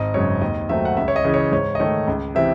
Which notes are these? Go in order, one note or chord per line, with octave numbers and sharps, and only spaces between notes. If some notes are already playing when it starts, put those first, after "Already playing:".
Already playing: G#1 D#5
F#2 C#3 G#3 C#5
D#2 D#5
D#3 F#3 A3 C4 E5
F#5
C#2 E5
C#5
D#5
C#3 E3
C#5
G#2 C#5
D#5
D#3 A3 C#5
C#2
C3 E3 C4 E5